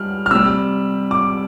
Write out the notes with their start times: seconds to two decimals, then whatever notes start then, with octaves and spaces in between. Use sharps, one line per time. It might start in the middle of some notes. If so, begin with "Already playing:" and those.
Already playing: G3 F6
0.26 F6
0.31 C3 G3 E6
1.11 D6